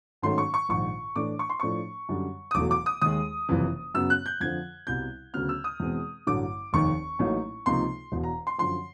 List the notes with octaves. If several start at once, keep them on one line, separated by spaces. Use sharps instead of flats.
G#2 D#3 F#3 A3 C#4 C6
C#6
C#6
A#1 G#2 D#3 C#6
A2 E3 A3 D4 D6
C#6
C6
A2 F3 A3 D4 C#6
F#2 D3 G3
D#6
E1 E2 B2 F#3 A3 D6
D6
D#6
D#2 D#3 G#3 D#6
F#1 F2 C3 E3
F#2 C#3 F#3 B3 E6
F#6
G6
F2 D3 F3 G#6
C2 B2 G3 G6
D2 C#3 F#3 B3 F6
E6
D#6
E2 B2 G#3 C4
A1 G2 D3 F#3 D6
F1 D#2 D#3 C#6
A1 A2 F#3 A#3 D#4
C#2 C3 F3 A#3 D#4 C6
E1 E2 B2
A#5
C6
F#2 D3 F3 C6